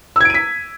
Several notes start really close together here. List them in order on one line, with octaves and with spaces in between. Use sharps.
E6 G#6 D7 D#7 B6